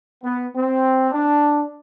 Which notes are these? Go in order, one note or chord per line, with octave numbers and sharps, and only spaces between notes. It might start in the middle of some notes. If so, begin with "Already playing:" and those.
B3
C4
D4